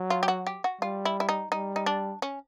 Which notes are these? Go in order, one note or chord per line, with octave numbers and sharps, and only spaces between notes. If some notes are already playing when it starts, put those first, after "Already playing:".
Already playing: F#3
F4
G4
F#4
G4
F#4
G3 F4
E4
E4
D#4
G3 D#4
D#4
D4
C#4